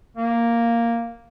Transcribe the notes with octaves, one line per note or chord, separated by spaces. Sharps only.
A#3